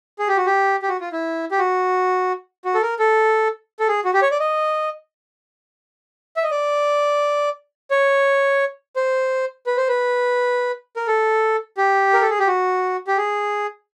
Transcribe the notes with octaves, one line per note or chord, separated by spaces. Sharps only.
G#4
G4
F#4
G4
G4
F#4
F4
E4
G4
F#4
F#4
A4
A#4
A4
A4
G#4
F#4
G4
C#5
D5
D#5
E5
D#5
D5
C#5
C5
B4
C5
B4
A#4
A4
G4
A#4
A4
G#4
G4
F#4
G4
G#4